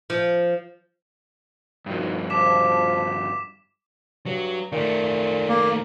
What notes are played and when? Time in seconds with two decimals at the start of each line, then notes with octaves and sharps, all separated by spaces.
0.10 F3
1.86 G2 F3 A#3 D#4 F#4
2.30 F4 C5 A5 D6 B6 E7
4.26 G2 F#3
4.72 A#2 D#3 A3
5.48 A#3